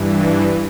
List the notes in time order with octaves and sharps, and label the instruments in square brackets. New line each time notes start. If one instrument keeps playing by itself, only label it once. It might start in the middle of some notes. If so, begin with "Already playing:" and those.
Already playing: [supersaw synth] G2 E3